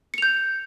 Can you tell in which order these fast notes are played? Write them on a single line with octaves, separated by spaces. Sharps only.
C#7 F7 G6